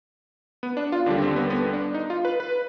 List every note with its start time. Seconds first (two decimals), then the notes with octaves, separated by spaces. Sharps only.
0.63 B3
0.77 D4
0.92 F4
1.06 D#2 D3 G3 D4
1.22 C4
1.36 B3
1.50 B3
1.73 D4
1.94 D#4
2.10 F4
2.25 B4
2.40 B4